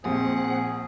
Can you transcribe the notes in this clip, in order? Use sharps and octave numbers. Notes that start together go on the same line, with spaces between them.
A#1 C4 G#4 F#5